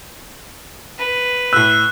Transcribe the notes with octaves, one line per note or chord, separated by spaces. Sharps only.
B4
A2 E6 F#6